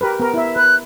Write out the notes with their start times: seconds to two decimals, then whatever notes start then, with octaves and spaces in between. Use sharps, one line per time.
0.01 G4 A#4 B4
0.20 B3 A#4
0.34 E4 E5
0.56 B4 F#6